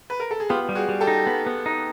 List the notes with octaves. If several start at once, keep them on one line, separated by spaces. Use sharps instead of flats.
B4
A#4
A4
G#4
B3 F4 G4
G3
F#4 G#4
G3
G4 A4
D#4
B3
B3
D#4